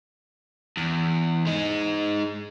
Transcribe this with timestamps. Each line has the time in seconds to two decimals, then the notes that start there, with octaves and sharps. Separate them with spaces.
0.77 E2
1.46 G#3 D#4